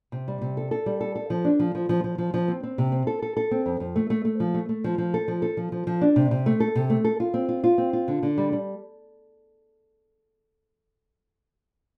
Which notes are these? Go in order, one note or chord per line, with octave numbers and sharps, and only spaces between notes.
C3
G3
C3
A4
A4
G3
A4
A4
F3
D4
F3
F3
F3
F3
F3
F3
C4
C4
C3
C4
A4
A4
A4
C4
F2
F2
A3
A3
A3
F3
A3
A3
F3
F3
A4
F3
A4
F3
F3
F3
D4
C3
C3
A3
A4
C3
A3
A4
F4
C4
F4
F4
C4
F4
D3
D3
G3
G3